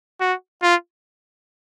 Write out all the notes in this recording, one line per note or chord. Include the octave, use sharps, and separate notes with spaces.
F#4
F4